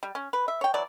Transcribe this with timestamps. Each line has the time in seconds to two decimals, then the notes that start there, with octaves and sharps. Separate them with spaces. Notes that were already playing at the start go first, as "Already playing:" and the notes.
0.03 G3
0.15 C#4
0.33 B4
0.48 E5
0.61 C#5 G5
0.74 E3 F#3 D5